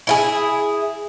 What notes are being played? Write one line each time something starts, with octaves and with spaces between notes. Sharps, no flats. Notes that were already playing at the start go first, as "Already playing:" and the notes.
E4 F4 G#4